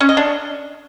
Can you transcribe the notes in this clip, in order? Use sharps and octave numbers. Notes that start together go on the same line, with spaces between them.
C#4
D#5
D4